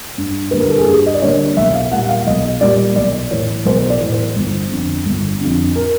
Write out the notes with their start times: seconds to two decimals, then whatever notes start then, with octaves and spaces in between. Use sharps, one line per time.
0.18 G2
0.51 D3 G3 A#3 B4
0.60 A#4
0.70 A4
0.78 G#4
0.87 G2 G4
1.06 D#5
1.14 D5
1.22 D3 G3 A#3 C#5
1.57 B1 E5
1.74 F5
1.91 A#2 G3 F#5
2.09 F5
2.27 B1 D#5
2.61 A#2 G3 D5
2.96 B1 D5
3.31 A2 E3 C#5
3.65 B1 C5
3.90 D5
4.00 A2 E3
4.13 C5
4.36 G1
4.70 F2 D3
5.05 G1
5.40 F2 D3
5.76 A#4